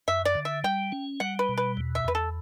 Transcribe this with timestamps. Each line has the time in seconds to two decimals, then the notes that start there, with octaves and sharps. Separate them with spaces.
0.08 F#2 E5
0.25 D5
0.35 D3
0.45 E5
0.64 G3 G5
0.92 C#4
1.20 G3 F#5
1.39 B4
1.49 B2
1.58 B4
1.77 E2
1.95 E5
2.05 E2 B4
2.15 A4